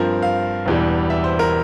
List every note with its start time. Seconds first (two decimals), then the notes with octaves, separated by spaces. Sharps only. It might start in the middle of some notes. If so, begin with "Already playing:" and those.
Already playing: G2 F3 C4 A#4
0.22 F5
0.66 E1 E2 E3 G3
1.10 E5
1.24 C5
1.39 A#4